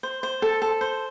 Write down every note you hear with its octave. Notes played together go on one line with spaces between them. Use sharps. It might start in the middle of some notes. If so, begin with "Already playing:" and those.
C5
C5
A4
A4
C5